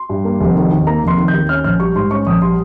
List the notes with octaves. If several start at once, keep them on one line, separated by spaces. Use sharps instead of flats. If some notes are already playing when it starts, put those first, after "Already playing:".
Already playing: C6
G2
A#3
F1
D#3
D#2
A#3 A#5
F1 C6
D#3
G6
D#2
C#4 F6
A#1 F6
G3 C#6
G#2 C6
C#4 C#6
A#1 D#6
G3 C6